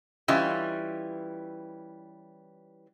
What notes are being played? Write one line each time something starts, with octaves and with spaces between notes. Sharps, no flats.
E3 G3 C#4 F4 D#5 E5